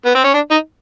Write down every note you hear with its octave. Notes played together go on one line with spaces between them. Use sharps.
B3
C4
C#4
D4
D#4